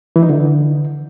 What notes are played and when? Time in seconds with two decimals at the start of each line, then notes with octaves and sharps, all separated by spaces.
0.16 E3
0.23 D#4
0.30 D3